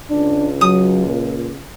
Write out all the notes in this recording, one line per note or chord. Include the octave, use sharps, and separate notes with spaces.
C#2 D4
F#3 D#6
A#2